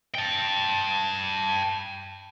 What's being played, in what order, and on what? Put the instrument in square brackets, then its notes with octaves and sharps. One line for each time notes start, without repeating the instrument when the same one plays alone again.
[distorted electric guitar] G5 A5